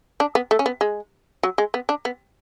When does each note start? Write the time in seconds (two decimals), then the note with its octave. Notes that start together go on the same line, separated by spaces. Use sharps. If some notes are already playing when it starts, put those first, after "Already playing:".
0.20 D4
0.35 B3
0.51 A3
0.59 C#4
0.66 B3
0.81 G#3
1.43 F#3
1.58 G#3
1.74 B3
1.89 D4
2.05 B3